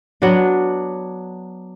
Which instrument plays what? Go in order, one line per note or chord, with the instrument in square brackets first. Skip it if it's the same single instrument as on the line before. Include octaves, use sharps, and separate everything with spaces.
[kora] F#3 B3 D4